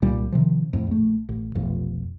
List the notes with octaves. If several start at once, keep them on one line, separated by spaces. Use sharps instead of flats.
C2 A#2 G3
C3 D#3 F3
F2 A2
A#1 A3
A1
F1 B1 F2